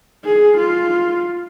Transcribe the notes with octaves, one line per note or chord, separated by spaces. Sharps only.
G#4
F4